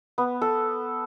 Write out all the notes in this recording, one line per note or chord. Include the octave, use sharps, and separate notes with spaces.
B3
A4